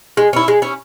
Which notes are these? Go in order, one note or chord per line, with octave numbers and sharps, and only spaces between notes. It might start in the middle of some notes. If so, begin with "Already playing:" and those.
G#3
C#4 E4
G#3
C#4 E4